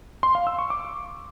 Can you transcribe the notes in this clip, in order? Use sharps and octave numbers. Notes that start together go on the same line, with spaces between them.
C6
F5
E6
C#6
D6